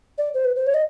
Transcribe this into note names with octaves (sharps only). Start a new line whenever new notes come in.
D5
C5
B4
C5
C#5
D#5